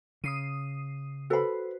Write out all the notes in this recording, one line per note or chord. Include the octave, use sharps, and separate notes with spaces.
C#3 D#6 C7 D#7
F#4 A4 B4 C5 B5